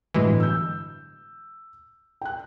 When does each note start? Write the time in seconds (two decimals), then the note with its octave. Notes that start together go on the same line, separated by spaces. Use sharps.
0.14 G1 A2 E3 F#3 G#3
0.40 E6 G6
2.21 G5 F#6